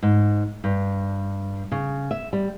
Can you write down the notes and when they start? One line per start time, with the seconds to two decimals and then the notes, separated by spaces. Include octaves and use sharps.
0.03 G#2
0.64 G2
1.72 C#3
2.11 E5
2.33 G3